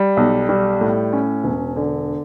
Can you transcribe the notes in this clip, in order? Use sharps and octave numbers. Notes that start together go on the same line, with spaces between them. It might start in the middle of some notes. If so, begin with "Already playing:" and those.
Already playing: G3
B1
G3
A2
C#4
E1
D3